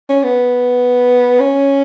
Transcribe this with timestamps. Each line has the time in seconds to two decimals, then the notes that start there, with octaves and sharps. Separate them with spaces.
0.09 C#4
0.23 B3
1.40 C#4